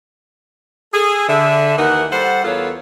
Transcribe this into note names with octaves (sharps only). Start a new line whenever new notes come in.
G#4 A4
D3 E5
D#2 E3 D#4 A#4 F#5
G3 A4 C5 F#5
E2 B3 F4 A4 A#4 C#5